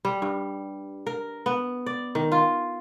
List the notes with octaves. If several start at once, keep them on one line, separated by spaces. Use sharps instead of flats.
G3
G2
A#4
B3
D5
D#3
F4